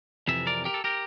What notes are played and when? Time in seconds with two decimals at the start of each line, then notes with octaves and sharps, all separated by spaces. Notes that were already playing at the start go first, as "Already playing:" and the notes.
0.28 F2 C3 E3 E5
0.47 A#4 D5
0.65 G4 A#4
0.74 A4
0.84 G4 A#4